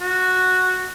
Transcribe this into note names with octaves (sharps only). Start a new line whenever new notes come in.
F#4